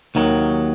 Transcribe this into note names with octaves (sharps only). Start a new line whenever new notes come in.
D#2 D#3 F#3